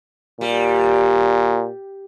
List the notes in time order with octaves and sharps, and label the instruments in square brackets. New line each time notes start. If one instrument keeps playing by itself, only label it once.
[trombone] A#2 [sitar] G3